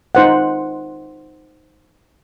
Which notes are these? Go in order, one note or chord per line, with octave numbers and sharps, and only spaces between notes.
D#4 C5 F#5